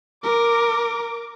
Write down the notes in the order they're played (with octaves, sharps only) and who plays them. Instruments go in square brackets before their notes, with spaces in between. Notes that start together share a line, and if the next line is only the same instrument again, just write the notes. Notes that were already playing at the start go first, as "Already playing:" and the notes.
[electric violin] A#4 [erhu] D6